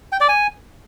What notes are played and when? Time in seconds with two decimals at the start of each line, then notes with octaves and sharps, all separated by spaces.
0.12 G5
0.20 D5
0.29 G#5